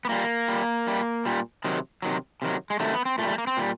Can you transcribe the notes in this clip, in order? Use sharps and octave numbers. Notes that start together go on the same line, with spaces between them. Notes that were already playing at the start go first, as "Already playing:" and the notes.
B3
A#2 G3 A#3
A#2 G3
A#2 G3
A#2 G3
C3 D#3 F#3
C3 D#3 F#3
C3 D#3 F#3
G#3
C3 D#3 F#3 A3
B3
C4
A#2 G3 A3
A3
A#3
C4
A#2 G3